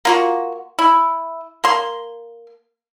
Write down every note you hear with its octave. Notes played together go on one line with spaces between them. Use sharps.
A#3 F4 F#4
E4
A#3 C6